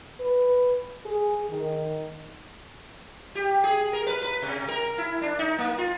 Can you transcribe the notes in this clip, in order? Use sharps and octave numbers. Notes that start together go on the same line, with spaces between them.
B4
G#4
D#3
G4
G#4
A#4
B4
B4
C3
A#4
E4
D4
D#4
A#3
F4